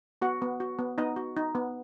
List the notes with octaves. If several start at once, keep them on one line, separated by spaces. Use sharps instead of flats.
B3 F#4 F#5
B3
F#4
B3
B3 D#4 D#5
F#4
D#4
B3